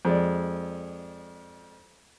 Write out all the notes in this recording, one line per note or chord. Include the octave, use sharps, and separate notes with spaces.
F2 G#3 D5